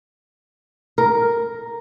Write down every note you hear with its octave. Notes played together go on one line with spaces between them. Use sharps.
A#4